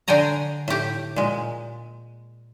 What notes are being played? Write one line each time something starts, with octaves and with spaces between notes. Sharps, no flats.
D3 D4 G5 G#5 A#5
A2 G4
A#2 G#3